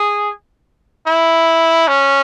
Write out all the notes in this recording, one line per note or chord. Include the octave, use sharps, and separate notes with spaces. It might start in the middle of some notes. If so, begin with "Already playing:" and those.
Already playing: G#4
E4
C#4